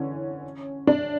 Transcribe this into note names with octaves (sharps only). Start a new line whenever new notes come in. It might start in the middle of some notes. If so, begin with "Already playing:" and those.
Already playing: D3 E3 C#4
D4